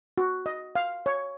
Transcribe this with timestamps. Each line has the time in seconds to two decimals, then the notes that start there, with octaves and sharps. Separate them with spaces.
0.18 F#4
0.46 D#5
0.75 F5
1.06 C#5